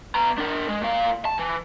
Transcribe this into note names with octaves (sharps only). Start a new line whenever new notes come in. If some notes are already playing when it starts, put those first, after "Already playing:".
B3 A#5
D4 A#4
G#3
A#2 F5
A5
E3